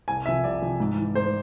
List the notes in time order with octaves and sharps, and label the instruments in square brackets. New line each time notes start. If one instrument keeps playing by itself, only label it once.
[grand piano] C2 G#5
C3 F3 E5
C2 D5
C3 F3
G#2
E3
G#2 C5